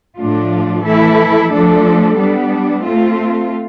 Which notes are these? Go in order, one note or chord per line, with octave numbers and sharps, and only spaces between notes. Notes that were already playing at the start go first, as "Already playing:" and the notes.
A2 F3 A3 D4 F4
E3 A3 E4 A4
F3 A3 D4 A4
G3 B3 D4
A3 C4 F4